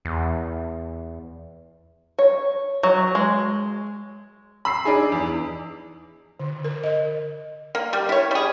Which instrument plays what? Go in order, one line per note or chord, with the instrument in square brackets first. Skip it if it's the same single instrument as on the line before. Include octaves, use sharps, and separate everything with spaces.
[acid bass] E2
[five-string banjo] C#5
F#3
G#3
[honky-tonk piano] B5 E6 C7
D4 D#4 G#4
E2
[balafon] D3
A#4
D#5
[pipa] A#3
G3
E4 C#5
G3 G#4